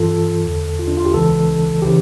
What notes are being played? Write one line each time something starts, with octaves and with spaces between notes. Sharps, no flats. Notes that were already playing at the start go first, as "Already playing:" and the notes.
Already playing: G2 E3 F4 A4
A4
E2 D3
F4
D4
F4
G4
C#2 C#3 E3 A4
C#3 E3 G4